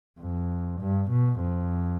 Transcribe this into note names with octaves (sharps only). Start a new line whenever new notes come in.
F2
G2
B2
F2